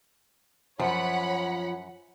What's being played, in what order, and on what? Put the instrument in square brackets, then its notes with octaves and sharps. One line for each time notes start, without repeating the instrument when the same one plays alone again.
[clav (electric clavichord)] F#2 [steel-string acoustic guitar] F3 [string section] C#5 F#5 B5